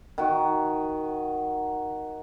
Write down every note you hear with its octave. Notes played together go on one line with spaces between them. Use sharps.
D#3 F#4